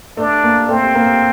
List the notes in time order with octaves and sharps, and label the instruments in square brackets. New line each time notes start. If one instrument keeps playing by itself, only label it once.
[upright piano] A3 [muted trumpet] D4
[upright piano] A#3
[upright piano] A3 [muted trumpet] C4
[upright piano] A#3